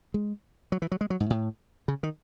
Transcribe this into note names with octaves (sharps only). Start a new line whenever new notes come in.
G#3
F#3
E3
F#3
G#3
F#3
G#2
A2
C#3
D#3